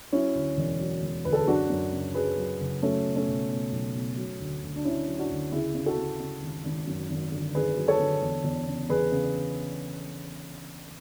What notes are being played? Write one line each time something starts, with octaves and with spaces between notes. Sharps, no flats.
F#3 C#4 E4
D2
E1
F#3
E1
D2 B4
A4
G#4
F#2 D4 F#4
F#2
C#3
F#3 G#4 B4
F#3
F#1
F#3 A3 C#4
B2
A3 C#4
B1
B2
B1
B2
F#3
D2
D2
D4
D3 C#4 E4
F#3
D4 F#4
D2
C#3 E4 G#4
C#3
F#4 A4
C#3
C#3
G#1
G#1
F#2
G#1
D3
G#1 G#4 B4
F#3
A4 C#5
D3
E2
E2
C#3
E2 G#4 B4
C#3